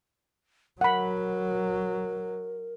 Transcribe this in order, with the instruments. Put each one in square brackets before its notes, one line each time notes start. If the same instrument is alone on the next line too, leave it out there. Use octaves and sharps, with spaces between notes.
[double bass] F#3 [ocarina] A#4 [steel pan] F#5 B5